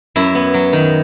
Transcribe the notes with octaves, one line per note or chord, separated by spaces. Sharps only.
F#2 E4
B3
F#3
D#3